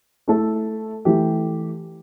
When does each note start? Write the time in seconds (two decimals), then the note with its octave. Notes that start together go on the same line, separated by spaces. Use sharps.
0.28 A3 E4 A4
1.05 E3 A3 G4